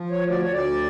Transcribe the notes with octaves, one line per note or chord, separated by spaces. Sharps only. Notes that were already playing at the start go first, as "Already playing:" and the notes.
Already playing: F3
C#5
D2
D5
C#5
D2 D5